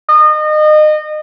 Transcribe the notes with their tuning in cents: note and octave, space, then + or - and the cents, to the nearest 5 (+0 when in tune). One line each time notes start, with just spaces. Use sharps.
D#5 -30